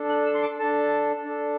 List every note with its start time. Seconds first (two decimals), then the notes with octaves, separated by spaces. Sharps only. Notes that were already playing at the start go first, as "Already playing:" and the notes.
Already playing: D4 A4
0.09 F#6
0.26 E6
0.34 C6
0.42 D6
0.59 D4 A4 A5
1.25 D4 A4